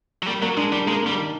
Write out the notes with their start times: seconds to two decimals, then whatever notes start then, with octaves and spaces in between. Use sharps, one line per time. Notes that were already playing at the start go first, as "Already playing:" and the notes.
0.22 F#3
0.27 G3 A#3
0.42 F#3 A#3
0.57 G#3 D4
0.72 G3 D4
0.87 G#3 A#3
1.03 G3 A#3
1.18 D#3